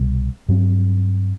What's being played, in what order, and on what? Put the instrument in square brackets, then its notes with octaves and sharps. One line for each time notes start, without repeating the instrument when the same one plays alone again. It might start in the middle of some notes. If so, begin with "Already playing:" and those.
Already playing: [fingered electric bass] C2 B2 G3
G2 F#3 C4